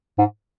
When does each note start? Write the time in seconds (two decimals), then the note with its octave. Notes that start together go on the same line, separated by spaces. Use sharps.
0.18 G#2